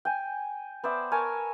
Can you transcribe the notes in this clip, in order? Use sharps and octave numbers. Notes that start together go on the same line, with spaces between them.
G5 G#5
B3 C5 D5 E5
A#4 C#5 G#5 A5